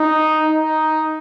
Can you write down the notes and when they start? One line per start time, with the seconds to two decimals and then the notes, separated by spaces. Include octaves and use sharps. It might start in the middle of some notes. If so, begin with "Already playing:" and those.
Already playing: D#4
0.48 D#4